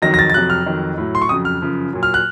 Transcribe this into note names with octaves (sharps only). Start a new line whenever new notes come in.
F2 D#3 F#3 A#6
A#6
A6
A6
F2 C3 F#3 F#6
F6
F2 D#3 F#3
A2 F#3
C6
C#6
F2 C#3 F#3 D#6
F6
F#2 C#3 F3
A#2 F#3
F6
F#6